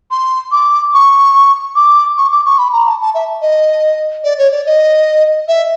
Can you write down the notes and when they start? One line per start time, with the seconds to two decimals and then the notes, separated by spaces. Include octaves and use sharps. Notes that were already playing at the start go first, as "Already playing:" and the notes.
0.11 C6
0.52 D6
0.94 C#6
1.75 D6
2.17 C#6
2.32 D6
2.45 C#6
2.58 B5
2.72 A#5
2.86 A5
3.01 A5
3.14 E5
3.41 D#5
4.24 D5
4.38 C#5
4.51 D5
4.66 D#5
5.48 E5